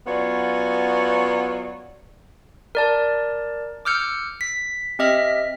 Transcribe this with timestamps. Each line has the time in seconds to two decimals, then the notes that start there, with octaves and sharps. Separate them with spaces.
0.07 F#3 B3 C#4 F4 C#5 D5
2.75 A#4 D5 A5
3.85 D6 E6 F6 G6 C#7
4.41 B6
4.99 C4 G4 D#5 E5 F6 B6